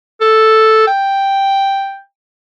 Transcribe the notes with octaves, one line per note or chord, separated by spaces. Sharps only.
A4
G5